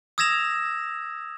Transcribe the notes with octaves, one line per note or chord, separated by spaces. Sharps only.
D#6 E6 G#6 A#6 E7 F7